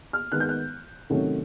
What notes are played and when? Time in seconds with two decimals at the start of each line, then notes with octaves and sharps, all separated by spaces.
0.13 F6
0.32 D#3 G#3 B3 F#6
0.40 G6
0.49 F#6
1.10 C3 D#3 F#3 A3 C#4